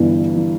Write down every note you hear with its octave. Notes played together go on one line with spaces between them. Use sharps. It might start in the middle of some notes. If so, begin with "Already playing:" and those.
Already playing: G1 G2 E3
E3